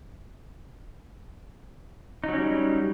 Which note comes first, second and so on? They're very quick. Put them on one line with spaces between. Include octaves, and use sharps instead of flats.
D#4 F#3 C#4 G3